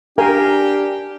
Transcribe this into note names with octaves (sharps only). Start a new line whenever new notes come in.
D4 G4 A#4 F5 G#5